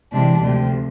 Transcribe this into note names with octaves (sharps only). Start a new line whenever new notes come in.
C3 E3 G#3 D4
D2 C3 F3